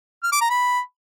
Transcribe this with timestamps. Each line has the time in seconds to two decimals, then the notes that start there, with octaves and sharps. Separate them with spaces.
0.23 F6
0.32 D6
0.41 A#5
0.50 B5